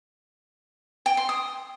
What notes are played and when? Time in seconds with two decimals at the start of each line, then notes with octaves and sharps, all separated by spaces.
1.06 G5
1.17 C6
1.29 D#6